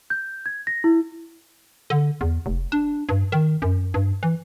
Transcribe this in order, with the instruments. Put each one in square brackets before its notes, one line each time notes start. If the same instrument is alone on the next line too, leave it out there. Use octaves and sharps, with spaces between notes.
[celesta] G6
G#6
A#6
E4
[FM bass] D3
E2
F1
D4
G2
D#3
F#2
G2
E3